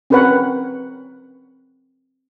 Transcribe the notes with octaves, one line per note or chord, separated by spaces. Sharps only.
C4 C#4 A#4 B4 C#5 F#5